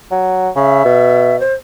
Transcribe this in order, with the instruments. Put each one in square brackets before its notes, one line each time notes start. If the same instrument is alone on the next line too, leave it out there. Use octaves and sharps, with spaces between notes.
[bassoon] F#3
[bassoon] C#3 [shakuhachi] E5
[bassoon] B2
[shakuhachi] C5